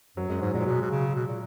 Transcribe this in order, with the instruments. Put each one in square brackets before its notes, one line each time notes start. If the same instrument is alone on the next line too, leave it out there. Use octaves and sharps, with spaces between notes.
[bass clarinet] F#2 [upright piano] F#3
[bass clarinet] F#2 [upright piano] G#3
[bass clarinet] G#2 [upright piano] F#3
[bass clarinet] A#2 [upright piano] G#3
[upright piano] F#3
[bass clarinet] B2 [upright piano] G#3
[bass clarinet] B2
C#3
B2
A#2